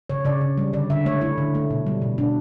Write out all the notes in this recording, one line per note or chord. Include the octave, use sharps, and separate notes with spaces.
C#3 C#5
C#3 D5
C#3
G3
D3 D5
D3 E5
A3 C#5
A3 E4
D3
A3
B2
G3
B2
B2 D4